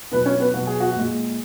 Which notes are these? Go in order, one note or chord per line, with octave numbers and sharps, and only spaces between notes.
B2 F#3 B3 B4
C#4 C#5
B3 B4
B2 F#3 F#4
G#4
F#4
A#2 G#3